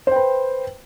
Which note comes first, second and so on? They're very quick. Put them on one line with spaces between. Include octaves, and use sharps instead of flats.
C5 G5 B4